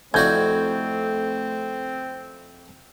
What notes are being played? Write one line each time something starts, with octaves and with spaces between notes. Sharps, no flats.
F2 A3 C4 E4 F#4 D5 G6 G#6